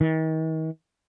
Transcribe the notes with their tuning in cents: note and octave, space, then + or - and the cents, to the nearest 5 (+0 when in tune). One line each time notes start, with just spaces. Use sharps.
D#3 +40